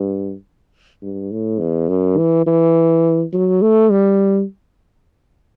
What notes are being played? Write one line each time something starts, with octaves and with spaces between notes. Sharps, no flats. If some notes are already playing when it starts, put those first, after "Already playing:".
Already playing: G2
G2
A2
E2
F#2
E3
E3
F#3
A3
G3